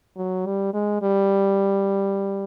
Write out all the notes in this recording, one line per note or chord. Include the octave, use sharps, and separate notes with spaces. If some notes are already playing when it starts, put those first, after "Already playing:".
F#3
G3
G#3
G3